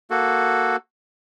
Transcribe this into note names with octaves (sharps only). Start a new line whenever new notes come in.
A#3 F#4 A4